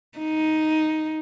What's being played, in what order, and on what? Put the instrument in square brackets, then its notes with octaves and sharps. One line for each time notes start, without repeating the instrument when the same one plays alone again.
[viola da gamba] D#4